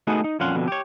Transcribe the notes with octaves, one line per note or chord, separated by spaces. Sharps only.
A3 B3 D#4 F#4 G#4
D#4
F2 A#2 C#4 F5 F#5 C6
F2 B2 D3
G4 C#5